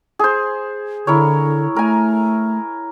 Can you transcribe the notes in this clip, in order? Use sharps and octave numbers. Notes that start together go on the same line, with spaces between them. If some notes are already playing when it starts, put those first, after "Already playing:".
G#4 C5
D3 E4 A#4 C#5
A3 A#4 G#5